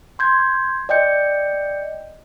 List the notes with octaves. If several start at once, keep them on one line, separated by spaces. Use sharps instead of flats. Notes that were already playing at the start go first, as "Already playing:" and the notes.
C6 G6 G#6
D5 D#5 G5 G6 C#7